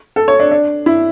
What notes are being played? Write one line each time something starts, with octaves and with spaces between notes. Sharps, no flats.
A4
C#5
D4
D4
E4